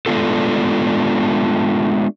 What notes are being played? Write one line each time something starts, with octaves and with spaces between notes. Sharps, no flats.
G#3 A3 B3 D4 F4 A4